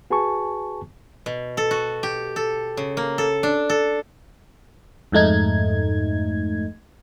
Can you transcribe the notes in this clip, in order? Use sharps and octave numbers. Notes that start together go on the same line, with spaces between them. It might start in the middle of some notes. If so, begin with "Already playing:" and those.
F#4 G#4 B4 G#5 A5 C#6
B2
A4
F#4
G4
A4
C#3
A#3
A4
D4
A4
F2 G#2 A3 D#4 G#6